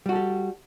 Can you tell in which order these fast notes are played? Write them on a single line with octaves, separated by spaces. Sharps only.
G3 F#4 A4 G4